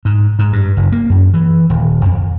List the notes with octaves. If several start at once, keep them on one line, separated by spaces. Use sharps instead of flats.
G#2
G#2
G2
F#1
A#3
F#2
E3
D#1
F2